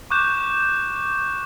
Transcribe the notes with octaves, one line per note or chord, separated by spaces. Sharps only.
C#6 D6 F#6 G6 E7